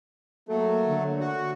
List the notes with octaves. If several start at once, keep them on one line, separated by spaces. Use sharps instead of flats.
F#3 A3 A#3 A4
D3
F#4